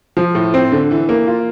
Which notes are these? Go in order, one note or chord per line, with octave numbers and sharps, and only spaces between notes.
F3
A2
C4
D3
E3
A#3
F4